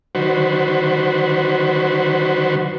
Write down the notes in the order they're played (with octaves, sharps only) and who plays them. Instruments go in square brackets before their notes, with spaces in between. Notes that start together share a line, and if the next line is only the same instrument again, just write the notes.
[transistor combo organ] D3 D#3 F#3 F#4 B4 C5